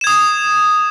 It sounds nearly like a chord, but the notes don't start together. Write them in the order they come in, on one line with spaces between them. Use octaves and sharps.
E7 G#6 D#6